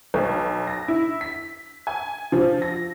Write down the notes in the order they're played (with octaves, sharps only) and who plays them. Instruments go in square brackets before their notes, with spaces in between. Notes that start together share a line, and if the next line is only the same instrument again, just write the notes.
[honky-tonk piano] B1
A#6
E4
B6
G#5
F3
A#6